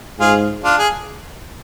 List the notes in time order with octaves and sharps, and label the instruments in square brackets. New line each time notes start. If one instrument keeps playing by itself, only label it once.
[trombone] G#2 [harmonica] F4 G#4
[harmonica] D4 F4
G#4